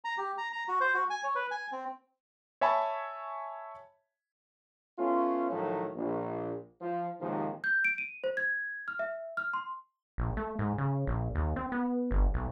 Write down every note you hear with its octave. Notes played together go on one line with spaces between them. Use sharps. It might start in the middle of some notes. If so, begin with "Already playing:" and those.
A#5
G4
A#5
A#5
F#4
C5
F#4
G#5
C#5
B4
G#5
C4
C#5 E5 G#5 A5 B5
A3 B3 C#4 F4
A2 D#3 F3 F#3 A3
A#1
F3
D#2 G#2 C3 D#3 F3
G6
D7
D#7
C5
G#6
F6
E5
F6
C6
A#1
A3
G#2
C#3
A#1
D#2
C4
B3
G1
B1